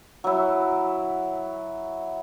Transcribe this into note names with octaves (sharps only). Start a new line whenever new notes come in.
F#3 E4